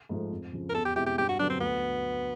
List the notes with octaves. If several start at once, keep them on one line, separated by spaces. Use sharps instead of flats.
G#2 F3 A3
F2
C#3 F3
A#4
E2 A4
G4
B2 G#3 C4 E4 G4
G4
G2 G4
F#4
D3 F#3 B3 D4
C4
D2 B3